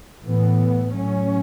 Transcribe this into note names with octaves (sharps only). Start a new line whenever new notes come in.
A2 E3 B3
A2 F#3 C#4